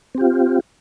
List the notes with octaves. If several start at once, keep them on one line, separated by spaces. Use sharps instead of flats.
C4 F4 G4